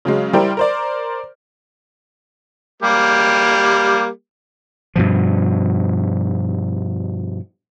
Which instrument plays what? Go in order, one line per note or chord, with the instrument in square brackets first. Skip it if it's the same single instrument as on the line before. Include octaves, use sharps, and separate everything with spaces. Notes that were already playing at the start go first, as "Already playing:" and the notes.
[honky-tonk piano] C#3 F#3 G#3
G3 E4 G4 A#4 C5
A#4 C5 D5
[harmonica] G3 A#3 G4
[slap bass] G2 B2 F3